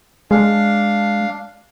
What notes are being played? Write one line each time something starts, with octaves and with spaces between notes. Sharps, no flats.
G#3 D4 F5